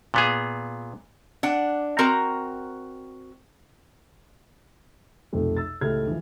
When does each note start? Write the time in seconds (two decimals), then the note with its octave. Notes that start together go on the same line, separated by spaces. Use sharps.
0.14 A#2 B3 G#4
1.43 D4 F#5
1.99 C4 F#4 A#4 A#5
5.33 B1 F2 C3 A3
5.57 E6 A6
5.81 C#2 A2 A3 G4 F6 G#6
6.07 E3 F3